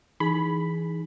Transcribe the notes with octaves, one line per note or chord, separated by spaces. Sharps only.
E3 D#4 G#4 B5